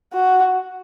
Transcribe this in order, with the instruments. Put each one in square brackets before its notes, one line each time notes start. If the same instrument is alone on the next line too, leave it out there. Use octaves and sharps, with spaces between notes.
[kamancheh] F#4